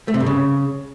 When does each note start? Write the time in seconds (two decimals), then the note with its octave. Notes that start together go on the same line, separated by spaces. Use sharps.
0.08 A3
0.14 C3
0.20 G2
0.26 C#3